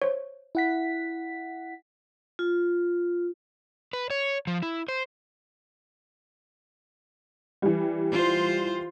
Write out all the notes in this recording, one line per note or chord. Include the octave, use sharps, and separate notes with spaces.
C5 C#5
E4 F#5 B6
F4
B4
C#5
F3
E4
C5
E3 G3
F4 C5